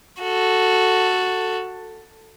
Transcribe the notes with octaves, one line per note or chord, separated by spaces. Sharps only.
F#4 A4